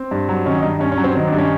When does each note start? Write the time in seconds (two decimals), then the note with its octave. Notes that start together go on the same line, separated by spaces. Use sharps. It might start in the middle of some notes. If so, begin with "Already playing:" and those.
Already playing: C4
0.11 G2
0.29 F#3
0.46 D#3 C#4
0.58 G2 D#4
0.80 G2 C#4
0.92 C#4
0.97 F#3
1.04 C4
1.15 D#3 C4
1.27 D4
1.32 G2
1.38 C#4